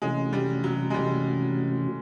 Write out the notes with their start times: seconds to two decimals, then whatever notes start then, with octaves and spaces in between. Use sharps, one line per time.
0.02 C3 E3 G#3 A3 C#4 F#4
0.33 G3
0.64 F#3
0.90 G#3
0.94 C3 E3 G3 A3 C#4 F#4